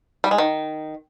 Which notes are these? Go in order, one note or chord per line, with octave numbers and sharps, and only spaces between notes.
G3
G#3
D#3